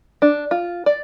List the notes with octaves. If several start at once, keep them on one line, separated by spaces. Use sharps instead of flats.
D4
F4
D5